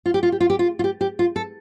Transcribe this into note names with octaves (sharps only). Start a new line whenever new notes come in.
F4
G4
F4
G4
F4
G4
F4
F4
G4
G4
F4
A4